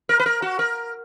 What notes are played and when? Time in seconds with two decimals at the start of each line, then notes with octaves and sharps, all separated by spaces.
0.09 A#4
0.20 B4
0.26 A#4
0.42 F#4
0.59 A#4